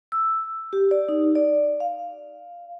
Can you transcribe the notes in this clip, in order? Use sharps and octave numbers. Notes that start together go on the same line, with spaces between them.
E6
G4
D5
D#4
D5
F5